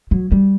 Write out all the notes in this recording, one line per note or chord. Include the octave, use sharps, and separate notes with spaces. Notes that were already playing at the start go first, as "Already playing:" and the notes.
F#3
G3